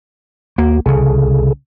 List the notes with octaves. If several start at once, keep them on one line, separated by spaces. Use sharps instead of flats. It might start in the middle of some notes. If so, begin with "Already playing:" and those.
D#2 A#3 F#4
C2 C#3 G#4 A4